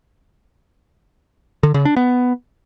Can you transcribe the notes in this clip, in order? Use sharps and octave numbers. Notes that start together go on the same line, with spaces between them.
D3
C#3
D4
B3